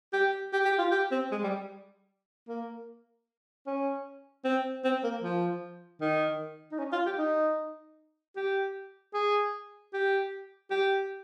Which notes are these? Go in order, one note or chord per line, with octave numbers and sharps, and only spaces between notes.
G4
G4
G4
F4
G4
C4
G#3
G3
A#3
C#4
C4
C4
A#3
F3
D#3
D#4
C#4
F4
G4
D#4
G4
G#4
G4
G4